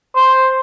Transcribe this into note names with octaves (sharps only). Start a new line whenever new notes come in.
C5